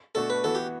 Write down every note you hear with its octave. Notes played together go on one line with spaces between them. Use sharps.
B2 A3 D4 F#4 A4
B4
E3 B3 F#4 A4
G4